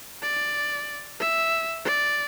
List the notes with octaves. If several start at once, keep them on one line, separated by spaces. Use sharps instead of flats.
D5
E5
D5